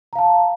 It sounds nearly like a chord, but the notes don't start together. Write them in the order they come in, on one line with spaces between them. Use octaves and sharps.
A#5 F5 A5